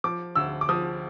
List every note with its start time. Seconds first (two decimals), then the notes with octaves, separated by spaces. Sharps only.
0.04 F3 D6
0.35 D2 E6
0.61 D6
0.69 F3 D#6